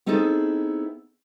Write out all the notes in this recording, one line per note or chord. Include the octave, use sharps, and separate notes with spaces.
B3 C4 D#4 E4 G#4 A4